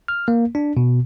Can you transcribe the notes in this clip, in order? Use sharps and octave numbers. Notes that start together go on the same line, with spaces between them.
F6
A#3
D4
B2